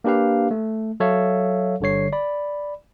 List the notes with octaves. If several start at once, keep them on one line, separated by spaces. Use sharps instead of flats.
A#3 D4 G4 B4 F5
A3
F#3 A4 C#5 E5 F5
G1 D3 G3 C#5 C7
D5 B5